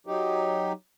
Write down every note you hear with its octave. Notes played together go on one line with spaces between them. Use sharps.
F#3 D#4 G4